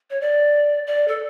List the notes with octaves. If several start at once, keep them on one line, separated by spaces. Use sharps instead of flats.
C#5
D5
D5
A4